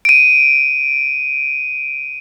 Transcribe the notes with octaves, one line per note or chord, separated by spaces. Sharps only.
D7 D#7